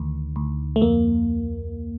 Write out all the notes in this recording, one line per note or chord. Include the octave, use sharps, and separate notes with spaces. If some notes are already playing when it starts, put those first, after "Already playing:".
Already playing: D2 D#3
D2
A3
F2 A#3